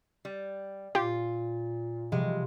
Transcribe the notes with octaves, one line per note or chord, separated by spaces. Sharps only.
G3
A#2 F4 G4
C3 F3 G3 G#3